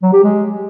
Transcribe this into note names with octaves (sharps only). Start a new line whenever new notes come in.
F#3
G4
G#3